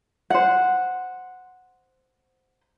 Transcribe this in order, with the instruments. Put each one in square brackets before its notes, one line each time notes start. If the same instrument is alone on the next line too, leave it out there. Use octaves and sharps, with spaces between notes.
[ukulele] C5 F#5